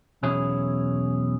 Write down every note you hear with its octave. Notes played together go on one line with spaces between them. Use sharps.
B1 E2 C#4 E4 G#4